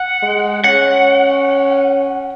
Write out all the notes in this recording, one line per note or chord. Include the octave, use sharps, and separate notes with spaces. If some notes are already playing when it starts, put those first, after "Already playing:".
Already playing: F#5
G#3
C#4 F#5